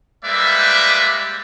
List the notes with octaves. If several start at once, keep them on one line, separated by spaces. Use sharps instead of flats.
G3 G#3 A#3 B4 D5 E5